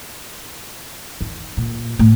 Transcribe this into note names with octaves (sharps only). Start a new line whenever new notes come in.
D#3
A#2
A2